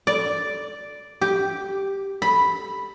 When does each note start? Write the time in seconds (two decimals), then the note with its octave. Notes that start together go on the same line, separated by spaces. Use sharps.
0.07 D5
1.21 G4
2.22 B5